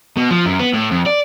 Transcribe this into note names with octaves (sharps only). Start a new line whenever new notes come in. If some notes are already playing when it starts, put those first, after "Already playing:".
B2
F3
F#2
B3
A2
F2
D5